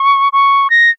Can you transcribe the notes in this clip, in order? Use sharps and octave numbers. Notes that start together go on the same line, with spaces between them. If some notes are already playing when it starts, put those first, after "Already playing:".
Already playing: C#6
C#6
A#6